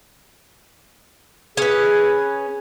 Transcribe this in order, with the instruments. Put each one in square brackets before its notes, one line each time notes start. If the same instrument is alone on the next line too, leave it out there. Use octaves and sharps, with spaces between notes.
[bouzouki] C#4 B4 [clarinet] G#4